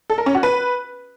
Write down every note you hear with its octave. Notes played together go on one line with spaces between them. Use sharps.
A4
A#4
C#4
F#4
B4